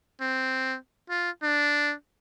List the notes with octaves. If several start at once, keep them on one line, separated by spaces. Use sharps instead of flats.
C4
F4
D4